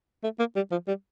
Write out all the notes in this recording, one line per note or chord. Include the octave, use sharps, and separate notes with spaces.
A3
A#3
G3
F3
G3